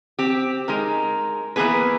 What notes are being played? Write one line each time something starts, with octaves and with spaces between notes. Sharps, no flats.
C4 G4
G#3 D#4 A#4
E3 A#3 B3 G#4 B4